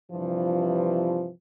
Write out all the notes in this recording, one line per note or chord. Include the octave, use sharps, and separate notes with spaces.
G2 C3 E3 F3